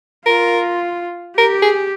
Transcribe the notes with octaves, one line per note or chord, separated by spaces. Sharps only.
F4 A#4
G4 A#4
G#4